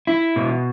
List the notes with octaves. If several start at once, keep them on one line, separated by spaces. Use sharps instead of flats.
E4
B2